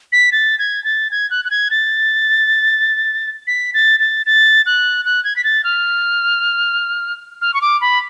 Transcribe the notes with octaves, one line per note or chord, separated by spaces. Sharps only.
B6
A6
G#6
A6
G#6
F#6
F#6
G#6
A6
B6
A6
A6
A6
F#6
F#6
G#6
B6
A6
F6
F6
C#6
D6
B5